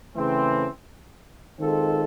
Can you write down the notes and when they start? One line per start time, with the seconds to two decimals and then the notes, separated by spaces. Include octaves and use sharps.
0.15 C#3 E3 A3 C4
1.59 D#3 G#3 C4 F4 A4